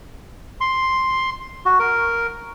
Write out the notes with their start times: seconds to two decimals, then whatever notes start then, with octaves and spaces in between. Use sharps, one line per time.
0.61 C6
1.65 F#4
1.79 A#4